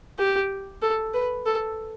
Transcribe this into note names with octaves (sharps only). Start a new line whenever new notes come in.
G4
A4
B4
A4